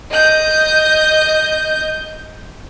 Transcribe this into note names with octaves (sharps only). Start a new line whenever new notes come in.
D#5 G6